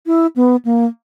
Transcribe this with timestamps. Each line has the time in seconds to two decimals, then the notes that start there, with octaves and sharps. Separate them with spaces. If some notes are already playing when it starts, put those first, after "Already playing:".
0.06 E4
0.36 B3
0.65 A#3